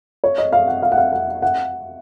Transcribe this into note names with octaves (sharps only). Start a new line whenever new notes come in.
C#5
D#5
F5
F#5
F5
F#5
F5
F#5
F#5